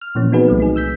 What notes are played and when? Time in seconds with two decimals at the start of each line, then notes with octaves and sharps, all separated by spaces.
0.01 F6
0.15 A#2 E3 F3 A#3 C#4
0.32 B3 C4 D#4 F#4 G#4 B4
0.48 C2 F#3 A3
0.60 D#4 G#4
0.76 E6 G6 B6